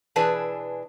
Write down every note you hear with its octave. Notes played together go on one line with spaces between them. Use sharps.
B2 E3 D4 G#4 B4 A5